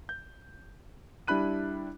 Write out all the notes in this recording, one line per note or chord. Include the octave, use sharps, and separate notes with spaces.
G6
G3 D4 E4 B5 F#6 D#7